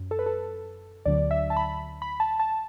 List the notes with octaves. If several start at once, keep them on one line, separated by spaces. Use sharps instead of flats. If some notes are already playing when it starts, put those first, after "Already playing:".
Already playing: F#2
A4
B4
A4
D2 D3 F#3 D5
E5
A5
B5
B5
A5
A5